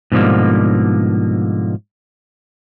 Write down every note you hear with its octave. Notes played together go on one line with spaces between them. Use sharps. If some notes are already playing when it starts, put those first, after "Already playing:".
G#2 B2 D3 F3 G3 A#3